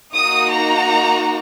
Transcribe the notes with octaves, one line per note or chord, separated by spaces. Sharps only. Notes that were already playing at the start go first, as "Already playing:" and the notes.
A#3 D#4 F#4 D#6
A#5